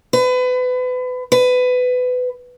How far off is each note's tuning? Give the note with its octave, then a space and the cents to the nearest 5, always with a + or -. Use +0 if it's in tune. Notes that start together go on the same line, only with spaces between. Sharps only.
B4 +30
B4 +20